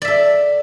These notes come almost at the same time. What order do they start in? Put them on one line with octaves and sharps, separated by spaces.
D5 E5 A4